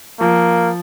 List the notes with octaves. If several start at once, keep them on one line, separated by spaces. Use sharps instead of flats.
F3 A#3